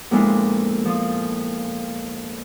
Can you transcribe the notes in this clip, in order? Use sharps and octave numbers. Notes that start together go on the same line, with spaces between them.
F2 A#2 G#3 B3 D4 E4
F3 D#6